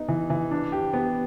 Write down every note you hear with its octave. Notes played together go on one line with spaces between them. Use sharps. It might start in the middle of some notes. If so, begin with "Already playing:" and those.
Already playing: B3 D#4
E3
E3
D4
G4
B3